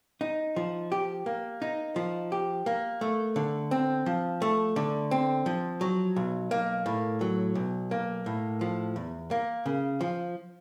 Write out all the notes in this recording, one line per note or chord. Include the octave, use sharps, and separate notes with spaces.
D#4
F3
G4
A#3
D#4
F3
G4
A#3
A3
D3
C4
F3
A3
D3
C4
F3
F#3
B1
A#3
A2
F#3
B1
A#3
A2
F3
E2
A#3
C#3
F3